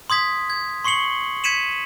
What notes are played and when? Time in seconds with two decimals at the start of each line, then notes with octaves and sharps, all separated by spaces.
0.10 C6 D#6 G#6 B6
0.50 G#6
0.84 C6 C#6 C7 C#7 F#7 G7
1.44 G#6 B6 C#7 D#7 E7 F#7